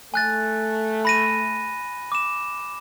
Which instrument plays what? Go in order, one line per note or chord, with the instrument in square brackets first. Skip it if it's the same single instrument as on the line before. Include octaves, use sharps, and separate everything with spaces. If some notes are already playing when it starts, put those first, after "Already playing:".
[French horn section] A3 [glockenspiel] G#5 F#6 A6
[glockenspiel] B5 A#6 D#7
D6 E7